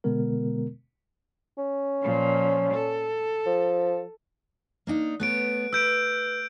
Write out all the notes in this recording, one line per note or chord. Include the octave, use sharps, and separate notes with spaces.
B2 D3 G#3 B3 A#4
C#4
A#2 F3
A4
F3
A#3 D4 D#4
A3 B3 C#5 F#6 D7
B4 E6 G6 D7